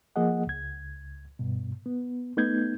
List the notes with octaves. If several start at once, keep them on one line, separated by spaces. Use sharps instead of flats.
F3 A#3 G#4 D#5 F#5
C#2 G#6
G2 B2
B3
A3 B3 D#4 G6 G#6